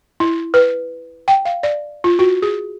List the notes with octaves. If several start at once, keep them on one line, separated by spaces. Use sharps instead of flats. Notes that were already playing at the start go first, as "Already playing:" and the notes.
E4
B4
G5
F5
D5
F4
F#4
G#4